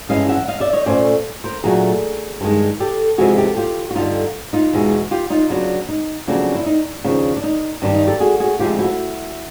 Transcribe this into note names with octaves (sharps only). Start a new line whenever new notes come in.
G2 E3 G#3 C#4 D#5 F5
E5 F#5
D#5 F5
D5 E5
C#5 D#5
A#2 F#3 A3 C#4 C5 D5
A#4 C5
A#2 F#3 A3 D4 G#4 A#4
G2 D#3 G#3
G4 A4
F2 C3 E3 G#3 F#4 G#4
G4 A4
F4 G4
F#4
G2 D3 G3 D#4 F4
D#4 F4
E2 B2 G#3
F4 G4
D#4 F4
C#3 F#3 B3 D4
D#4
F2 C#3 F#3 A#3 D4
E4
D#4
D#2 C#3 F3 D4
D4
D#4
G2 D#3 G3 D4
D#4
G4 A4
F#4 G#4
F#4 G#4
D2 C3 F3 G#3 F4 G4
E4 F#4